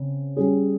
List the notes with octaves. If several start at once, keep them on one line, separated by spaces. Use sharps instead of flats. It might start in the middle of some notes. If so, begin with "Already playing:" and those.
Already playing: C#3 C4
G3 C#4 G#4